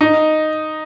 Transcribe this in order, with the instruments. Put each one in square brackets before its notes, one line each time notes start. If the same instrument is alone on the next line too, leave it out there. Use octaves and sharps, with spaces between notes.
[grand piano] D#4